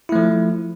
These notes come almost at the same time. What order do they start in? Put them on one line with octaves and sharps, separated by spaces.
E4 A3 F3